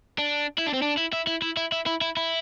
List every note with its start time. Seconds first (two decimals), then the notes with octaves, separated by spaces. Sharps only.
0.18 D4
0.58 E4
0.66 D4
0.73 C4
0.82 D4
0.97 E4
1.13 E4
1.27 E4
1.42 E4
1.57 E4
1.72 E4
1.86 E4
2.01 E4
2.17 E4